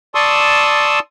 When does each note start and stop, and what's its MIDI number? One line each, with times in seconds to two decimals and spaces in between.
0.15 0.99 74
0.15 0.99 81
0.15 0.99 84
0.15 0.99 85
0.15 0.99 87
0.15 0.99 88